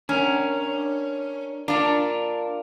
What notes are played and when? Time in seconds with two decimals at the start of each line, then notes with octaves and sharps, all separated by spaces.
0.09 C#4 D4 A#4
1.68 D4 F4 A#4 D5